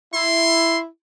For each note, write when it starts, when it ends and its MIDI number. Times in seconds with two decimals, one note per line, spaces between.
0.14 0.86 64
0.14 0.79 84